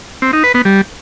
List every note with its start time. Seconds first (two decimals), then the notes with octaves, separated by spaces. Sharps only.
0.22 C4
0.33 D#4
0.44 B4
0.54 B3
0.65 G3